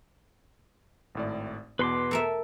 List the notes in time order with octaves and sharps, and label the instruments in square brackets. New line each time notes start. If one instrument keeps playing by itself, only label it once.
[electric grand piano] G#1 A2 D5
[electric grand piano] E2 B2 [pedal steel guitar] B4 C6 D6
[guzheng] A4 A#4 E5